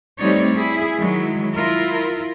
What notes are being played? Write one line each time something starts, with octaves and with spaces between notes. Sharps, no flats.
G3 A3 C4 D#4 C#5 D5
E4 G#4
D#3 F#3 G#3 E4
E4 F4 A#4